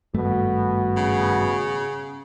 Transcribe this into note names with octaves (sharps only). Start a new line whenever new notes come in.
G#1 G2 B2 A3
C#3